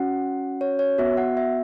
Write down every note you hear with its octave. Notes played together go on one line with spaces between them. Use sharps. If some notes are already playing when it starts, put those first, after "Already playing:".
Already playing: C#4 F#4 F#5
C#5
C#5
B3 F#4 E5
F#5
E5